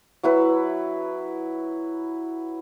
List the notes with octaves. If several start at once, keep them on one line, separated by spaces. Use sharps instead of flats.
F#3 E4 B4